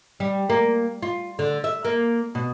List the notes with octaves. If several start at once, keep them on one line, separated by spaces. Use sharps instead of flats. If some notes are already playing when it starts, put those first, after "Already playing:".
G3
A#3
F4
D3
E5
A#3
B2